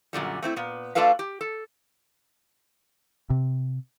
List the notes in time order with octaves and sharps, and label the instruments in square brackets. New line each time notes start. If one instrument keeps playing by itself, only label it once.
[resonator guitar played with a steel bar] F#2 A#2 D3 G3
A3 C4 E4
A#2 B3
A3 D4 F4 A4 B4 F5
G4
A4
[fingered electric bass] C3